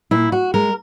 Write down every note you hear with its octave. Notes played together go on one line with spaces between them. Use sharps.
A#2 E4
F#4
G#3 A#4